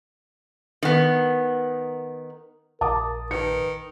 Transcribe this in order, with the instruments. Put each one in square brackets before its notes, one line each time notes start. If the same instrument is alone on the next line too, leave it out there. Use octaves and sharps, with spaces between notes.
[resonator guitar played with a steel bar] D#3 B3
[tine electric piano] A#1 [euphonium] A#4 [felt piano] A5 D6 D#6
[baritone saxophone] D#3 [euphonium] B4 [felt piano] C#7